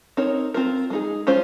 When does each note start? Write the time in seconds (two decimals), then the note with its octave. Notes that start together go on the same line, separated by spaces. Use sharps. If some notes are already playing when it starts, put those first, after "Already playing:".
0.17 C4 D#4 A#4 C#5
0.54 C4 F4 A#4
0.90 G#3 D#4 G#4
1.27 G#3 C#4 F4 C5